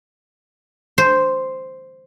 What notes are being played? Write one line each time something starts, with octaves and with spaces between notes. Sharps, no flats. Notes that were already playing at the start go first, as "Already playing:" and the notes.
C5